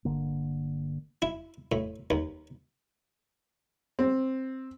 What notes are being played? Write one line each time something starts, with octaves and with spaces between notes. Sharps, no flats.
G1 D3 A#3
E4
A2
D#2
C4